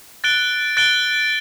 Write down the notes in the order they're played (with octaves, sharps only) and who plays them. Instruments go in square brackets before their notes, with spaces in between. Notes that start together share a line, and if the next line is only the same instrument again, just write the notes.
[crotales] F#6 A6 D7 G7
F#6 A6 D7 G7